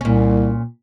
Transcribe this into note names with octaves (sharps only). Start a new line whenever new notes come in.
C2 A#2 C#4